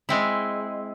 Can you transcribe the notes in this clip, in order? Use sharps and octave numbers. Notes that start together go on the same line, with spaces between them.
G#3 C4 E4